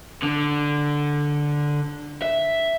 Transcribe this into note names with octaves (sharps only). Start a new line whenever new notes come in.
D3
E5